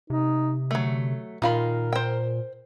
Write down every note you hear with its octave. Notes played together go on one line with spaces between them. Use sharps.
C3 D#4
D3 F#3 A3
A#2 D#3 F4 A#4 B5
C5 G5